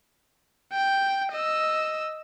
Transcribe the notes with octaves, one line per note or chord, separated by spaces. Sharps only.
G5
D#5 E6